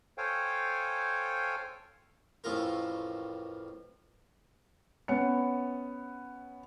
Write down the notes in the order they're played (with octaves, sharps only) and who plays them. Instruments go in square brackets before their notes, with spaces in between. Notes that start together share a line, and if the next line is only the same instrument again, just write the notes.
[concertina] A4 C5 C#5 F5 G5 G#5
[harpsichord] A1 F2 A2 F4 A#4
[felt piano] B3 C#4 C#7